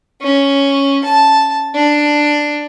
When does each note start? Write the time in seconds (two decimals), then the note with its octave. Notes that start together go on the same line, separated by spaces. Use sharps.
0.21 C#4
1.04 A5
1.74 D4